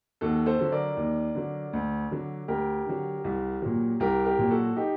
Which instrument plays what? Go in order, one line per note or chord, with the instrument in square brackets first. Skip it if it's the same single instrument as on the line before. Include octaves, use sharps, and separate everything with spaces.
[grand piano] D#2 F#4 A4
A4 C5
D3 F#3
A#4 D5
D#2
D3 F#3
D2
D3 F#3
D2 G4 A#4
D3 F#3
C2
A#2 F#3
C2 G4 A#4
G4 A#4
A#2 F#3
F#4 A4
D#4 G4